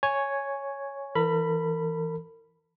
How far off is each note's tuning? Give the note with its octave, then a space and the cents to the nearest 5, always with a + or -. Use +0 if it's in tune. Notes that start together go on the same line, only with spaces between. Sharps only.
C#5 +0 G#5 +0
E3 -5 A#4 -40 B5 +0